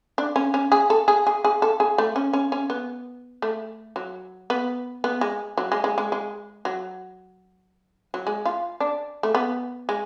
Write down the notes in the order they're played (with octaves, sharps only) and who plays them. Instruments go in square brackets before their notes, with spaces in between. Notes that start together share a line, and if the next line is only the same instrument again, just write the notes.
[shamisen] D4
C#4
C#4
G#4
A4
G#4
G#4
G#4
A4
G#4
A3
C#4
C#4
C#4
B3
A3
F#3
B3
B3
G#3
F#3
G#3
G#3
G#3
G#3
F#3
F#3
G#3
F4
D4
A3
B3
G#3